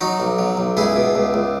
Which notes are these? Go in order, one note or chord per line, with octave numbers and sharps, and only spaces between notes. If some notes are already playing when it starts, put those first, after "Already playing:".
F#3 D#4 F#4
B1
F#3
B1
C#2 E4 G#4
B2
C#2
C#2